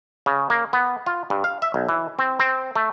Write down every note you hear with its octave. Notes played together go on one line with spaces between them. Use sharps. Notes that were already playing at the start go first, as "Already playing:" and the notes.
C#3
A#3
B3
F4
G2
F5
E5
B1
E3
C4
C4
A3